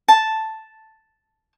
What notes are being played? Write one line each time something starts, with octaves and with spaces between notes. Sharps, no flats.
A5